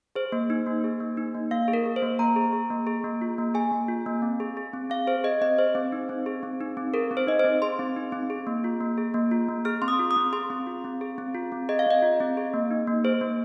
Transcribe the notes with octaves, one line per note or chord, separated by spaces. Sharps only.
G#4 C5
A#3
D#4
A#3
G#4
A#3
D#4
A#3
A#3 F5
G#4
A#4
G#4
C5
A#3
A#3 A#5
G#4
G#4
A#3
G#4
A#3
F4
A#3
G#4 G#5
A#3
F4
A#3
C4
G#4
G#4
C4
C4 F5
G#4 C5
G#4 D#5
C4 D#5
G#4 C5
C4
D#4
C4
G#4
C4
D#4
C4
G#4 A#4
C4
C5
D#4 D#5
C5
C4
G#4 C6
C4
D#4
C4
G#4
A#3
F4
A#3
G#4
A#3
F4
A#3
G#4 F6
C4 C6
D#6
F4
D#6
C4
G#4 C6
C4
F4
C4
G#4
C4
F4
C4
G#4 D#5
F5
C4 D#5
F4
C4
G#4
A#3
D#4
A#3
G#4 C5
A#3